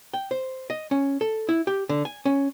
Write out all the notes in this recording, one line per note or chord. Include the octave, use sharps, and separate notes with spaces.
G5
C5
D#5
C#4
A4
E4
G4
D3
G#5
C#4